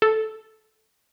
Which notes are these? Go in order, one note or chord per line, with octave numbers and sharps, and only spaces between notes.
A4